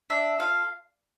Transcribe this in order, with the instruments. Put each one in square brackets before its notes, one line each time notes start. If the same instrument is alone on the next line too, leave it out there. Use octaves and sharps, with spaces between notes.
[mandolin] D4 E5
F4 A4 F5